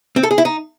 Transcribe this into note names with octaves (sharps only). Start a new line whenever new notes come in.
C4
A4
G#4
E4
D#4